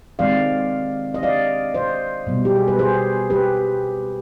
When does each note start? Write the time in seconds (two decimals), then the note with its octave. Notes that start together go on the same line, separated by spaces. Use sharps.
0.19 D#3 G#3 C4 D5 F5
1.14 D#5
1.23 D5 F5
1.74 C5 D#5
2.27 B2 G3 B3
2.45 G4
2.56 G#4
2.68 B4
2.79 G#4 C5
3.30 G4 B4